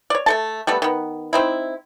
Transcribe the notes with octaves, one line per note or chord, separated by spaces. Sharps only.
C#5 D5
A3 A4 A5
G3 A3 B3 A4
D#3 B3
C4 D#4 E4